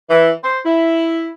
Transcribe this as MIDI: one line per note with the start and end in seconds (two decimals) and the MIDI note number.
0.10 0.32 52
0.44 0.59 72
0.65 1.31 64